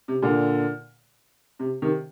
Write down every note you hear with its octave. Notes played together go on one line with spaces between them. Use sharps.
C3
A#2 D3
C3
C3 D#3